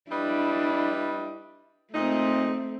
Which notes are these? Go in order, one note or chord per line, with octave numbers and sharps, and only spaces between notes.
G3 D4 E4 B4 D#5
A#2 A3 C4 D#4